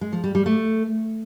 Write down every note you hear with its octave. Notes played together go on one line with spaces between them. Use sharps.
G#3
F3
G3
G3
A3